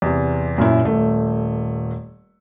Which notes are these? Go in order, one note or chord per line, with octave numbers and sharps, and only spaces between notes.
E2 C3
F#2 A#2 E4
D#1 A3